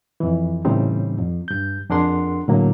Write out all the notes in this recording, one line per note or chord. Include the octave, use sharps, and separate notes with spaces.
F2 E3
A2 C#3 E3 G3 C4 D#4
F2
G2 G6
F2 D4 G#4 A#4 F#5 C6
A2 D3 F#3 A#3